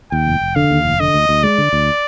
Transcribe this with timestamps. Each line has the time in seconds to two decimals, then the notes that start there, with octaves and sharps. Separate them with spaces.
0.12 D#2 G5
0.27 F1
0.41 F1
0.55 D3 F5
0.71 D#2
0.85 F1
1.00 D3 D#5
1.14 D2
1.29 D2
1.43 G#3 D5
1.58 D3
1.73 D2